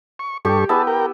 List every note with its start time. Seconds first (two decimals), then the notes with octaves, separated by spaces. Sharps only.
0.19 C#6
0.45 G2 G4 A4 C#6
0.69 B3 E4 G#4 A5
0.87 A#4 G5